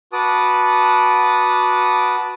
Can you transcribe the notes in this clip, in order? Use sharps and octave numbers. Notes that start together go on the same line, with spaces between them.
F#4 B4 A5 D6 D#6